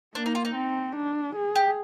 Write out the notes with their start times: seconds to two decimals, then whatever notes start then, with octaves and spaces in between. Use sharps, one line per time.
0.15 A#3 D4
0.26 D#4
0.35 F4
0.45 D#4
0.55 C4
0.96 D4
1.35 G#4
1.55 G4